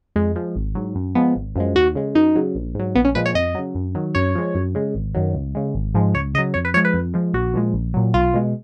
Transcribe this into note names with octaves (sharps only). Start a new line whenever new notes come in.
F2 G#3
F3 G#3
G#1
G#2 F#3
F#2
F3 G#3 B3
G#1
F#2 F3 G#3
D#2 F#4
C#3 G#3
F#2 D#4
C#3 F#3
A#1
G#2 F#3
A#1 B3
C#4
A#2 F3 G#3 B4
C#5
F2 D#5
C#3 F#3
F#2
D#3 F#3
F#2 C#5
F3 G#3
F#2
C#3 G#3
G#1
F#2 D#3 F#3
C#2
C#3 G#3
G#1
G#2 F3 G#3
C#2 C#5
C#3 F#3 D#5
F2 C#5
B4
F3 G#3 C#5
B4
F2
F3 G#3
A#1 F#4
A#2 F3 G#3
A#1
A#2 F#3
B1 F4
B2 G#3